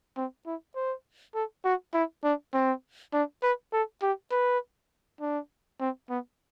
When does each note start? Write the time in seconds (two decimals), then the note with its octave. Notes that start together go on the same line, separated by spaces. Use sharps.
0.17 C4
0.46 E4
0.75 C5
1.35 A4
1.65 F#4
1.94 E4
2.24 D4
2.54 C4
3.13 D4
3.43 B4
3.73 A4
4.03 G4
4.31 B4
5.21 D4
5.80 C4
6.10 B3